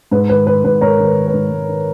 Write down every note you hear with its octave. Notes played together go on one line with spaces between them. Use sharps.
G#2 B4
D#3 B4
D#3 B4
G#2 B4
G#2 A#4 C#5
D#3
B4
D#3
B4
G#2
G#2
D#3